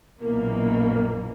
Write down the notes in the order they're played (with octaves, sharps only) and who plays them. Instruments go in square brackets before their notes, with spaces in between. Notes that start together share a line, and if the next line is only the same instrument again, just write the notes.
[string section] A#1 F#2 B2 E3 A#3